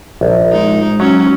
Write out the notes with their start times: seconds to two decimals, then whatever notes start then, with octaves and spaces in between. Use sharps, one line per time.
0.21 A#1
0.52 G#3 D#4
1.00 F#3 C#4